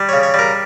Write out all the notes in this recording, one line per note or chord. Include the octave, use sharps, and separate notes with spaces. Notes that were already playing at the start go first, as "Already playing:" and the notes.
Already playing: G3
C#3 C#5
C#5
G3 A#4